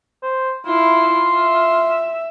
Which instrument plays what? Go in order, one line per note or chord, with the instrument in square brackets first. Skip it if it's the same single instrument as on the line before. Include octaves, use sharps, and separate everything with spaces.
[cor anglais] C5
[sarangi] E4 [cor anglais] F4
[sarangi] E5